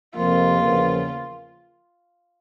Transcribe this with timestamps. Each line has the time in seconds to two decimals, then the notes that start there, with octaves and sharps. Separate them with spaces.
0.15 F2 C3 F3 A#3 F4
0.59 E2 C#3 F3 A#3